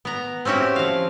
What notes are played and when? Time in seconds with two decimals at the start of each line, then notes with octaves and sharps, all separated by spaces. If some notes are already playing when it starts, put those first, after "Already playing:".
0.05 B3 A#5
0.45 C4 C#4 E4 F#4 G4
0.76 F3 F5